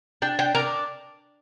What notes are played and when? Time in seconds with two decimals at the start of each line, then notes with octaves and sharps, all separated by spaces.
0.22 D4 G5
0.39 G5
0.55 D4 A#4